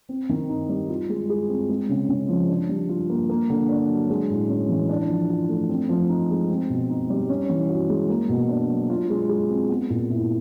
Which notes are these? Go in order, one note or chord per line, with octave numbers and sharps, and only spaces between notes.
C4
D#3
D#4
G3
F4
G#3
G#4
C4
G#3
C#3
C#3
F3
D4
G3
F4
A#3
A#3
D3
D4
F#3
G#3
A2
C#4
E3
D4
F3
F4
A3
C4
F3
D#4
G#3
C4
B2
D#4
G3
C#4
E3
F#4
G#3
A#3
B2
D4
F#3
F4
G#3
G#4
C4
B3
A#2
E4